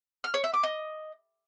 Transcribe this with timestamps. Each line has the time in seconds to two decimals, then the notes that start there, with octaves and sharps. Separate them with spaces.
0.24 F6
0.34 C#5
0.44 E5
0.54 D6
0.63 D#5